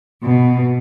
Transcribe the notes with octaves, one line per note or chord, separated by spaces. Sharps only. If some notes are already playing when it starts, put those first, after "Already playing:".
B2